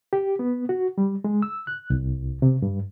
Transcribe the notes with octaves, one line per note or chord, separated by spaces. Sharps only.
G4
B3
F#4
G3
G#3
E6
F#6
C2
C3
G2